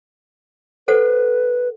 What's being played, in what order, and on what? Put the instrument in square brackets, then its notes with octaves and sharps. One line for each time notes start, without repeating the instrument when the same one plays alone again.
[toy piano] A4 C5 F#5 [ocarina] B4